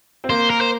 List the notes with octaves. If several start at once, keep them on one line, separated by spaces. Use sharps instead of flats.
C4
A#3 C5
A#4
C5